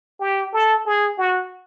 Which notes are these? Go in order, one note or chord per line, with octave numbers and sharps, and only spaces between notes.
G4
A4
G#4
F#4